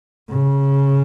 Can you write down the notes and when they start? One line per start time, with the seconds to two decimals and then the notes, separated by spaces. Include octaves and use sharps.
0.30 C#3